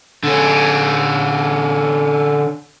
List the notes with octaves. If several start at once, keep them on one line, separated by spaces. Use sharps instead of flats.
D3 C#4